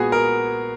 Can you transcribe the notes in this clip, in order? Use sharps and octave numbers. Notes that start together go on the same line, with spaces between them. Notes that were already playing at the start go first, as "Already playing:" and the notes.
Already playing: A#2 G#3 B3 F#4 G#4
A#4